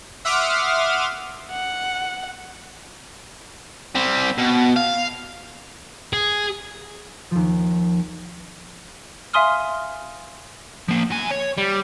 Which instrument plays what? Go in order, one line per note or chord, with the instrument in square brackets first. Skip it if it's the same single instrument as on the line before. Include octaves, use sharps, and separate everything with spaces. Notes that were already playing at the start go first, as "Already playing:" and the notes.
[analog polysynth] E5 F#5 C6 D6 D#6 F6
[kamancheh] F#5
[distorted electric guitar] G3 C4
B2
F5
G#4
[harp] D#2 F3
[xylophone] E5 F5 G#5 C6 D#6 F6
[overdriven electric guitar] F3 A#3
F#3 G#5
C#5
G3